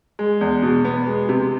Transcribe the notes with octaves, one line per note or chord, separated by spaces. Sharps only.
G#3
E2
B2
B3
G#3
C3